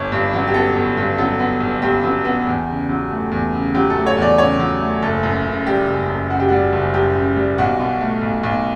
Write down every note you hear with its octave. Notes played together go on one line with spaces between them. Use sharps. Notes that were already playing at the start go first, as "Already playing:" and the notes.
Already playing: G1 C#5
G2
F#3
G4
B3 A4
G1
G2
F#3 A4
B3
G1
G2 G4
F#3
B3
E2
C#3
F#3
A3
E2
C#3
F#3 G4
A4
A3
C#5
E2 D5
C#3 C#5
F#3
A3
F#1 A4
F#2
C#3
G3 G4
F#1
F#2
C#3 F#4
G4
G3 F#4
F#1
F#2 G4
C#3
G3
B1 F#4
B2
A3
B1
B1